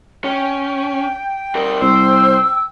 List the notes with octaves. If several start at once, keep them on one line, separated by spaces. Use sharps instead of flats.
C#4 G5
G3 A#4
C2 C5 E6